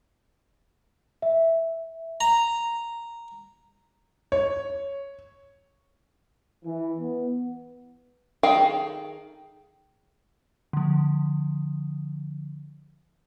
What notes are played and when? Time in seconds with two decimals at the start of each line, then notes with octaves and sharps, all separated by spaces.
1.22 E5
2.21 A#5
4.32 C#5
6.64 E3
6.99 B3
8.43 D#3 G#4 A4 F5 G5
10.73 D3 F3